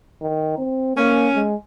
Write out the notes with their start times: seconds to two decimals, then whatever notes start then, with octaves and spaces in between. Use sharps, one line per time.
0.22 D#3
0.58 C4
0.96 A#3 C#4
1.35 G#3